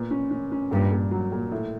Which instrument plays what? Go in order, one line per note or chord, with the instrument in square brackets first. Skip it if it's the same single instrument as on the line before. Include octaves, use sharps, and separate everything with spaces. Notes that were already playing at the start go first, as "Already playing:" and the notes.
Already playing: [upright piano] A#2 B3
C#4
C#4
C#4
[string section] G2 [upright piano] A#2
[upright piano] A#2
F#3
A#2
A2